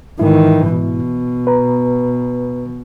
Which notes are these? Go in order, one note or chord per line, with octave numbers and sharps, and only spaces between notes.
G#2 D#3 E3 E4
B2
B4 A#5